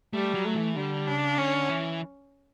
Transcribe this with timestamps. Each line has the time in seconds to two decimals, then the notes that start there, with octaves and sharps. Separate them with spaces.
0.13 G3 A3
0.34 F#3
0.45 A3
0.55 E3
0.76 D3 G3
1.07 C#3 D4
1.38 D3 C#4
1.69 E3